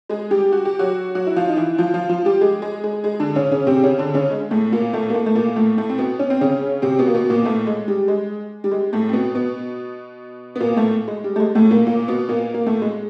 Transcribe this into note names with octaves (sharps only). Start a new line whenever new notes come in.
G#3 G#4
G3 G4
F#4
G4
F#3 F#4
F#3 F#4
E4
F3 F4
D#4
E3 E4
F3 F4
F3 F4
F3 F4
G3 G4
G#3 G#4
G#3 G#4
G#3 G#4
G#3 G#4
D3 D4
C#3 C#4
C#3 C#4
C3 C4
C#3 C#4
D3 D4
C#3 C#4
G#3
A2 A3
A#2 A#3
A2 A3
A#3
A2 A3
A3
A#2 A#3
A2 A3
A2 A3
C4
B2 B3
C#4
C4
C#3 C#4
C3 C4
B2 B3
A#3
B2 B3
A#2 A#3
A2 A3
G#3
G3
G#3
G3
G#3
A2 A3
C4
B2 B3
B2 B3
B3
A#2 A#3
A2 A3
G#3
G3
A3
G#3
A2 A3
A#2 A#3
A#2 A#3
B2 B3
A#2 A#3
A#3
A2 A3
G#3